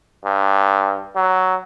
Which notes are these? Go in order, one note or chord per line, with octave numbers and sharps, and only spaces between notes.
G2
F#3